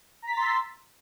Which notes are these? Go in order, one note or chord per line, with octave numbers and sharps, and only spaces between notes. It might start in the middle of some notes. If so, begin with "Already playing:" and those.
A#5 C6 E6 A6 B6